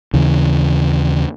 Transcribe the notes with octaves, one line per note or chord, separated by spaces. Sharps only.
D#2 C#3 E3